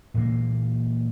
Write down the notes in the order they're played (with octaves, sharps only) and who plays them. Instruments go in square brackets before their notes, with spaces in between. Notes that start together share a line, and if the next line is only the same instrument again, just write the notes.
[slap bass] A#2 E3 A#3